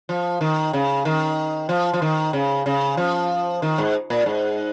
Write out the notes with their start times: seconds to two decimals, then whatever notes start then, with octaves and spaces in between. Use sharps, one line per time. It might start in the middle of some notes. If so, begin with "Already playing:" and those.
0.09 F3
0.41 D#3
0.73 C#3
1.05 D#3
1.69 F3
1.93 F3
2.02 D#3
2.33 C#3
2.66 C#3
2.97 F3
3.62 D#3
3.78 G#2
4.10 A#2
4.26 G#2